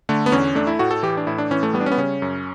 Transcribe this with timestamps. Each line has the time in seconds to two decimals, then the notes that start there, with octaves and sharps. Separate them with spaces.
0.09 D3 A3
0.26 B3
0.32 E2 C#4
0.55 A3 D4
0.67 E4
0.79 A2 F#4
0.91 A4
1.03 E3 G4
1.17 D4
1.27 A2 E4
1.38 D4
1.51 E3 C#4
1.63 A3
1.74 G3 B3
1.80 D4
1.86 C#4
1.92 B3
1.97 C#3 C#4
2.22 F#2